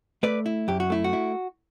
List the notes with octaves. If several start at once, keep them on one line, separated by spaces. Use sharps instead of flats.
A3 B4 D5
E4
F#2 G4
F#4
A3 E4
F#4
E4